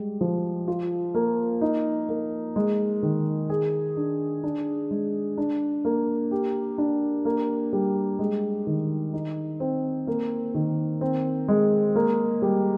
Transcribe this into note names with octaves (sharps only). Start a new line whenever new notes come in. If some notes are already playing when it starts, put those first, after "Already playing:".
Already playing: G3 G#3
F3
F4
A#3
D#4
A#3
G#3
D#3
G#4
D4
D4
G#3
D4
A#3
G4
D4
A#3
G3
G#3
D#3
D#4
C4
A#3
D#3
C4
G#3
A#3
G3